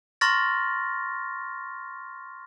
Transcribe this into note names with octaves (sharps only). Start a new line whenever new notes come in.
A#5 C6 C#6 F6 A6 A#6